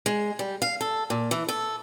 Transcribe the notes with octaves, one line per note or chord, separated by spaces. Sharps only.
G#3
G3
F5
A4
A#2
E3
A4